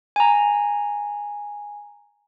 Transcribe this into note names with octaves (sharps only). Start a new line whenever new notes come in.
G#5 A#5